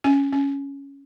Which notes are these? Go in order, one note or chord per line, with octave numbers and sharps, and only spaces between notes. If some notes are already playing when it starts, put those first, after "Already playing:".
C#4 G#5
C#4